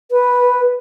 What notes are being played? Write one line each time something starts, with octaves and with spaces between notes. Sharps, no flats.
B4